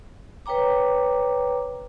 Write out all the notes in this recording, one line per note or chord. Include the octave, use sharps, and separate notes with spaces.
B4 C#5 G5 A#5 D6